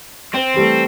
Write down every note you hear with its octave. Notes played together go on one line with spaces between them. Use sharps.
C4 C5
E3 G3 A3